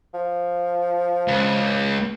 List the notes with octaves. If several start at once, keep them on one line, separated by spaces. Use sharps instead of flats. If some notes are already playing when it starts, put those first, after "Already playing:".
F3
C#2